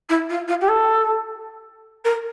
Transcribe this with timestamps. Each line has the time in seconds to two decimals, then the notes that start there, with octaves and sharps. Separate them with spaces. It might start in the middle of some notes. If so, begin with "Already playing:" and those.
0.09 E4
0.29 F4
0.47 F4
0.61 G4
0.68 A4
2.04 A#4